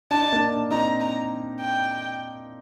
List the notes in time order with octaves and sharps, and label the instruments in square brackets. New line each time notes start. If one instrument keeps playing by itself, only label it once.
[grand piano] D4 [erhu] A5
[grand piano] D#4
A#3 D4
[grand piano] C4 D#4 [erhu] A#5
[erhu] A#5
G5